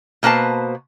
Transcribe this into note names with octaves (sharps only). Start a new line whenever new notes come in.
B2 A#3 B4 C5 A5